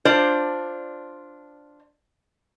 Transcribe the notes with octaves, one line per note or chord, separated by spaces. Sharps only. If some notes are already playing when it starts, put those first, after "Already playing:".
D4 F4 C5 D5